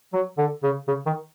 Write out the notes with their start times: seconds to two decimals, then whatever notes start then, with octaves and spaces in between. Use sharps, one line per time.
0.13 F#3
0.38 D3
0.63 C#3
0.87 C#3
1.06 D#3